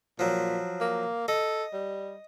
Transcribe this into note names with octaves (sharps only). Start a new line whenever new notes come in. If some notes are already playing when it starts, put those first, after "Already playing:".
A#2 F3 F#3
A#3
A4 D#5
G3